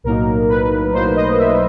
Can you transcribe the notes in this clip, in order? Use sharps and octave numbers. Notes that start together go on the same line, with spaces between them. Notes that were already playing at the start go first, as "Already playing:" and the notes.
B1 A2 F#3 A#3 D#4 A#4
B4
B1 A2 F#3 A#3 D#4 C5
D#5
E5